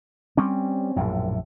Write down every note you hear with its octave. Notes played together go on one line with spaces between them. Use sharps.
G3 C4 C#4
A#1 F#2 A2